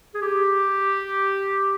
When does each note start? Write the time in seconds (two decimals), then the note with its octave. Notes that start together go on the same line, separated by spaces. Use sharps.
0.14 G#4
0.22 G4